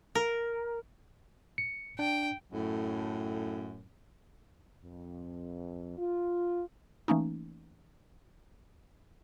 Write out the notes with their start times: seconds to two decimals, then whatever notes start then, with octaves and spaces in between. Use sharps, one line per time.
0.15 A#4
1.58 C#7
1.99 D4 G5
2.52 F#2 A2
4.82 F2
5.98 F4
7.08 E3 A3 A#3 C#4 D#4